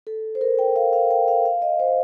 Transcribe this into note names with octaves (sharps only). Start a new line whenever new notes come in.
A4
C5
A#4
G5
F5
F5
G5
F5
F5
D#5
C5